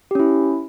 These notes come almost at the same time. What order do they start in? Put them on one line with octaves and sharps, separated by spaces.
G4 C#4 E4